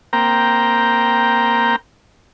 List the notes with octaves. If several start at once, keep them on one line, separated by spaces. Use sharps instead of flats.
A#3 C4 G5 A#5